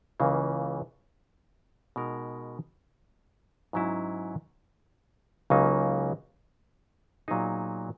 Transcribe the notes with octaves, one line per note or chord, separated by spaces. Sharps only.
C#2 C#3 E3 A#3
B2 G#3 D#4 A#4
G#2 F#3 C#4 E4
C#2 C#3 F#3 A#3 D#4
A#2 F#3 B3 D#4 G#4